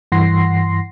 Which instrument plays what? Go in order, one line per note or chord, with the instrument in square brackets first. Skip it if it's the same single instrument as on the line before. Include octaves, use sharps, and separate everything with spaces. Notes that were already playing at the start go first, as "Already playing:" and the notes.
[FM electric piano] G2 E3 F#5 C6 A#6 C7